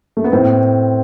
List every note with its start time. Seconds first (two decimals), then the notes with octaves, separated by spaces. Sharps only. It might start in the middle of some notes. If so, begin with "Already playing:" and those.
0.17 A3
0.24 B3
0.32 A2 C4